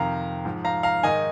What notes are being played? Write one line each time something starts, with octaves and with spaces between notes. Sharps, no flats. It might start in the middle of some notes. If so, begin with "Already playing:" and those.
Already playing: F2 C3 D#3 F5 A#5
G#2 F3
F5 A#5
F5 A#5
G#2 D#3 D#5 G#5